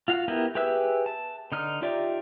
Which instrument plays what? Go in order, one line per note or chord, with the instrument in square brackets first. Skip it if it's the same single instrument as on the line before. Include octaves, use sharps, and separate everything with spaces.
[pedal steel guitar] F4 F#4 F5
B3 E4 G4 A#4 B4
G4 G#4 B4 E5 E6
A5
D3 D#4 F6
D#4 F4 G4 D5 E5